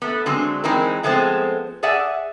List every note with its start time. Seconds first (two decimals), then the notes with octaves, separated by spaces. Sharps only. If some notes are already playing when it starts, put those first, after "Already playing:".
0.02 A3 B3
0.26 D3 F#3 G#3 C4
0.64 E3 G#3 C4 D#4 A#4
1.03 F3 G#3 A3 B3 C4 C5
1.83 G#4 D5 E5 F#5 G#5